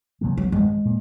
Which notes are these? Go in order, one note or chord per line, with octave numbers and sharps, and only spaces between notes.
C#2 C3 F#3 A#3
F#3
G#1 F#2 F3 G#3
A#2